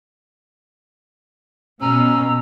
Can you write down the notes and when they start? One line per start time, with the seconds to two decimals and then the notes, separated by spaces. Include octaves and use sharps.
1.81 B2 C#4 A#5 E6